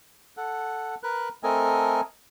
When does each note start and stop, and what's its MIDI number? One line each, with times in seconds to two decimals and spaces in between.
0.37 0.95 69
0.37 0.95 78
1.03 1.29 70
1.03 1.29 71
1.03 1.29 90
1.43 2.01 57
1.43 2.01 60
1.43 2.01 69
1.43 2.01 70
1.43 2.01 75
1.43 2.01 80